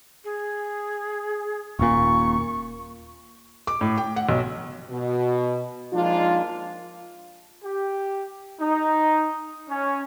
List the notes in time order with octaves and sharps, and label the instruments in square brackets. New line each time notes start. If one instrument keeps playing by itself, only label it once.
[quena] G#4
[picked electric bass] D#1 A#2 [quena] C#6
[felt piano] D6
A2
G5
F#5
B1
[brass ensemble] B2
F3 G#3 A#3 D4 D#4 F4
[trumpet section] G4
D#4
C#4